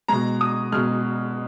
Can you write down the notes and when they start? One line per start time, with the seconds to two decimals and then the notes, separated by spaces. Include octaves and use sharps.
0.08 B2 G#3 A#5
0.41 D#6
0.72 B2 G#3 F6